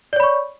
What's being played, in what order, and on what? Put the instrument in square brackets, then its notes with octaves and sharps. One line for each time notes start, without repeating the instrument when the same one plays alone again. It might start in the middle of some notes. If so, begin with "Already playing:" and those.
[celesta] D5
C#5
B5
C#6